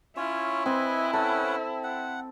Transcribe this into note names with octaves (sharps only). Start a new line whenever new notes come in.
C#4 E4 F4 C#5
C4 B4 D#5 G#5
C#4 A4 B4 F#5
F#5